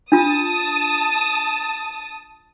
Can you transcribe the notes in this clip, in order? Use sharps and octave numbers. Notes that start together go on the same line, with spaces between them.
D4 F4 A5 D#6